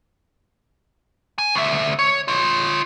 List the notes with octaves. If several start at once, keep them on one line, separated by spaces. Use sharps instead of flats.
G#5
D2 E5
C#5
F4 C#5